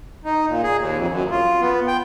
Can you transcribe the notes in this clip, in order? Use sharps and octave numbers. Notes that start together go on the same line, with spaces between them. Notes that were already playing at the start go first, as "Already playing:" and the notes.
D#4
A#2
G#4
D#2
F2
F#2
F4
B3
G5